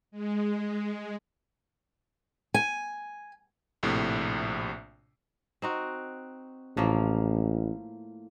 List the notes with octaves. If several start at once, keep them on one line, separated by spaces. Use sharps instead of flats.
G#3
G#5
A#1 A2 C3
C4 D#4 F#4
A1 A2 F3 A#3